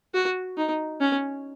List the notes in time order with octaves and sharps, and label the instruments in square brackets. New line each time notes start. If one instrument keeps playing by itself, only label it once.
[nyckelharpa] F#4
D#4
C#4